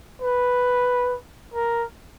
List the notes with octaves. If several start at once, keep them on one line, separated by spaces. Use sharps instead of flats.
B4
A#4